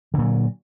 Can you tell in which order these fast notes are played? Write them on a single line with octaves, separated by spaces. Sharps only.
D3 A#2 F#3